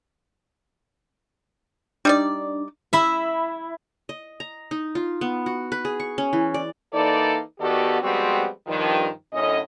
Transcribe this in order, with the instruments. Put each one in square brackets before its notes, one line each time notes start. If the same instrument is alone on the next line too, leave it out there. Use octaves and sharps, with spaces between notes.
[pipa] G3 D#4 D5 [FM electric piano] D4
[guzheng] E4 E5
[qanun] D#5
A#5
D#4
F4
B3
F#4
B4
G#4
C#6
C#4
E3
D5
[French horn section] E3 A#3 D#4 A4 D5
D#3 B3 F#4 G4 A4 D5
F3 G3 G#3 B3 C4 F#4
G2 D#3 F3
F#2 A2 D3 C#4 D#5